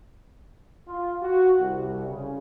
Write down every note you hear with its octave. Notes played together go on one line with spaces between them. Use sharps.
F4
F#4
C2
C#3